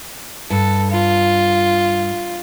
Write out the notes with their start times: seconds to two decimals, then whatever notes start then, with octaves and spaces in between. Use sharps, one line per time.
0.50 G2 A4
0.91 F4